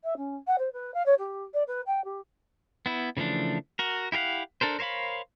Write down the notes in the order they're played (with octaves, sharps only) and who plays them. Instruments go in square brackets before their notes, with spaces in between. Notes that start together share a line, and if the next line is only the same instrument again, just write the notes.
[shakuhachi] E5
C#4
F#5
C5
B4
F5
C#5
G4
D5
B4
G5
G4
[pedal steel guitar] B3 E4
C#3 E3 F3 A3 D4
F#4 A#4
E4 G4 A#4 F5 F#5
D4 A4 A#4 C5
A#4 C5 C#5 F5 B5